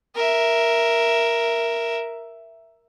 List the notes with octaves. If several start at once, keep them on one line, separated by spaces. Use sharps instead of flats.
A#4 E5